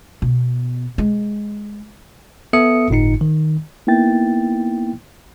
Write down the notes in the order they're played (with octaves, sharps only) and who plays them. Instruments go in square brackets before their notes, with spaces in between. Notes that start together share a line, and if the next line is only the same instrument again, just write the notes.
[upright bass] B2
G#3
[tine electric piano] B3 A4 E5 D#6 C#7
G1 A2 D#4 C#7
D#3
[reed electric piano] A#3 B3 D#4 E4 G5 A6